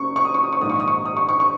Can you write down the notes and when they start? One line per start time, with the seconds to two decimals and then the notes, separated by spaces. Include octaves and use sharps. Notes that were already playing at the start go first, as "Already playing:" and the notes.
Already playing: F#1 F#2 C#6
0.16 C#6
0.25 D#6
0.34 C#6
0.43 D#6
0.53 C#6
0.61 A#1 G#2 D#3 A#3 D#6
0.70 C#6
0.80 D#6
0.88 C#6
1.05 D#6
1.17 C#6
1.29 C#6
1.40 C#6